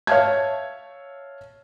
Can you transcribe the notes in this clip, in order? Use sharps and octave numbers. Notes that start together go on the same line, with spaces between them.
C#5 E5 F5 A5 G#6